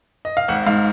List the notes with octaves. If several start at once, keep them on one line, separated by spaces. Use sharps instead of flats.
D#5
F5
G#1 F#5
G#2 F5